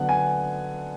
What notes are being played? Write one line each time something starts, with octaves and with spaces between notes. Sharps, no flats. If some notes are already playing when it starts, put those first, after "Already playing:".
Already playing: D3 F#3 B3 D4 F#5
G#5